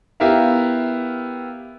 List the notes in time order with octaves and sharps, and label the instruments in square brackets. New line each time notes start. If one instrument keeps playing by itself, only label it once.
[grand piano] B3 E4 G4 A#4 E5 F5